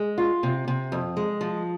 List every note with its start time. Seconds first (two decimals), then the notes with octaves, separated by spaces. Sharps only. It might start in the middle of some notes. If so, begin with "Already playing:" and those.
Already playing: G#3
0.18 F4
0.43 C3
0.68 C3
0.92 F2
1.17 G#3
1.41 F3